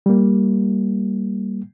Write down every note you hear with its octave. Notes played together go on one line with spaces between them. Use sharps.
G3 A#3